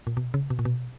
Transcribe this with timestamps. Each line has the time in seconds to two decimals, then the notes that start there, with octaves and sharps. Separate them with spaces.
0.07 A#2
0.17 B2
0.34 C#3
0.50 B2
0.59 A#2
0.65 B2